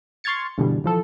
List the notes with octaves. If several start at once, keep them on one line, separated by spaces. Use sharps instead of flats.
C6 C#6 F6 G#6 A6 C#7
G2 B2 D3 E3 G3
E3 F3 A4